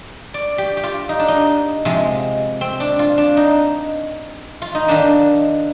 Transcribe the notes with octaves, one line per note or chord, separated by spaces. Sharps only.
D5
G4
G4
F4
D#4
D4
D#4
C3 F3 G#3
C4
D4
F4
D4
D#4
F4
D#4
D#3 A#3 D4